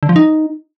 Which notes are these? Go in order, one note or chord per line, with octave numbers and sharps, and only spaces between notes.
D3
F3
D#4